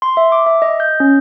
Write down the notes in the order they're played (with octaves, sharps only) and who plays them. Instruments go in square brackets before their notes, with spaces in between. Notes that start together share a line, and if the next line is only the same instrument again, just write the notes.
[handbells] C6
E5
D6
E5
D#5
G6
C#4